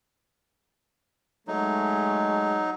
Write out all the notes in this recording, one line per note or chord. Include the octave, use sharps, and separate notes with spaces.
F#3 G#3 A3 D#4